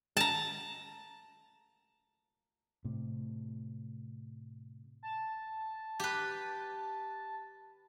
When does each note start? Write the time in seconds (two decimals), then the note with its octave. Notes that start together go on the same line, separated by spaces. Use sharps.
0.17 A5 A#5
2.85 A2 C3
5.03 A5
6.00 G4 B4